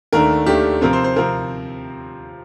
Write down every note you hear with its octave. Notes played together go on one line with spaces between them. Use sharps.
D#2 D#3 A3 D4 A#4
D#2 D#3 A3 D4 G4
C3 F3 C4 A#4
C5
C5
C3 F3 C4 A#4